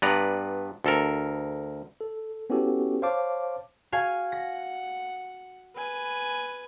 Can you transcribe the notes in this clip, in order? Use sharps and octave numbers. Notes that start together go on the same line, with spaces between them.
G2 B3 B4 D5 A#5
D2 A4 A#4
A4
B3 C#4 E4 F#4 G4 A4
C5 C#5 F5 A5 D6
F#4 F5 G#5
F#5 A#6
B4 G#5